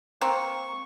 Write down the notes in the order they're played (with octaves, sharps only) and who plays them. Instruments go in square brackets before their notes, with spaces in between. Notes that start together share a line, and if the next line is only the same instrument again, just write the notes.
[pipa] A#3 C4 [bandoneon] C#6